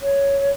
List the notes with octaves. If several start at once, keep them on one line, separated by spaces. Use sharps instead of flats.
C#5